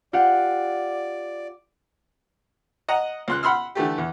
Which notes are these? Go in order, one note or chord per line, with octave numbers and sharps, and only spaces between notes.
F4 G4 D5 F#5
D#5 F#5 A#5
C#2 C6 F#6
F#5 B5 C6 E6 F6
D3 E3 A3 G4
E2